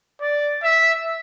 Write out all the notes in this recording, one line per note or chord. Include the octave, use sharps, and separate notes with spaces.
D5
E5